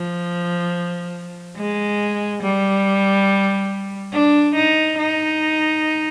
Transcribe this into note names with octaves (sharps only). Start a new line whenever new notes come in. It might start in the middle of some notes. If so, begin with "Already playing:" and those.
Already playing: F3
G#3
G3
D4
D#4
D#4